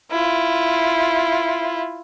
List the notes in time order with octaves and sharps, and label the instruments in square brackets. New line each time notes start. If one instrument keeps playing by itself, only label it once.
[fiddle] E4 F4